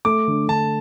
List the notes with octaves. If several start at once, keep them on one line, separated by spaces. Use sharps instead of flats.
A3 D6
D3
D3 A5